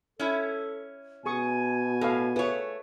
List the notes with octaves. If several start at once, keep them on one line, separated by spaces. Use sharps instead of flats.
C#4 E4 A4
B2 G#4 G#5 C#6 D#6
A2 A4 E5 F5
A3 F4 G#4 B4 C#5